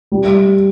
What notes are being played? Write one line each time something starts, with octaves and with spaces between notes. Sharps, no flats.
G3